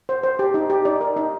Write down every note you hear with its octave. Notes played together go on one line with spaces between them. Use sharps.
C5
C5
G4
D#4
G4
D#4 D5
A#4
D#4